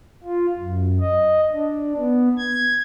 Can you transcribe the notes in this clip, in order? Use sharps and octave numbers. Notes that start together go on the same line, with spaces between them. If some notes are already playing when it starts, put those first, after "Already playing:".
F4
F#2
D#5
D4
B3
G#6